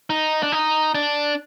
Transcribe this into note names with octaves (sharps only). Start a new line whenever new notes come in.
D#4
D4
D#4
D4